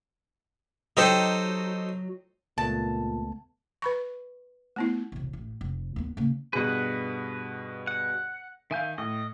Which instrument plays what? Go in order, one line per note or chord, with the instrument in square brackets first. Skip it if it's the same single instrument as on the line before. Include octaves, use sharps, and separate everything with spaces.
[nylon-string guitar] F#3 [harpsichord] D#4 A4 C5 [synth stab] G4 D#5
[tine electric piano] C#2 A3 B3 [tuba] A#2 [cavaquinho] A5
[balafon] B4 B5 C#6
A3 B3 E4
[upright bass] E1 C2
A1
F1
D#2 B3
C#3 A#3
[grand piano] G2 B2 G#4 [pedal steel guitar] B4 F#5
[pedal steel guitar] F#5
[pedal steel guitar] D#3 G#5 G6 [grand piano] E5 F5
[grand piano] A2 [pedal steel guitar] D#5